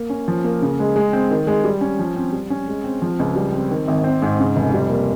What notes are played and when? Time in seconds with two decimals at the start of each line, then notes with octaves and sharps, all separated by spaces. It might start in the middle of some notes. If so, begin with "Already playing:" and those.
Already playing: A#3
0.10 C#4
0.28 F3
0.44 A#3
0.62 C#3
0.79 G#3
0.96 G#3
1.13 C4
1.31 D#3
1.47 G#3
1.64 G3
1.81 C#4
1.99 F3
2.16 C4
2.32 G3
2.50 C#4
2.68 G#3
2.84 C4
3.02 F3
3.19 C#2
3.36 G3
3.53 C4
3.71 D#3
3.88 G#1
4.04 C4
4.22 G#2
4.39 C#3
4.56 F1
4.74 G3
4.90 A#3